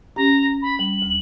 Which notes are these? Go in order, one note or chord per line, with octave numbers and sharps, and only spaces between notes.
C#4 G4 A#5
B5
G3 F#7
D2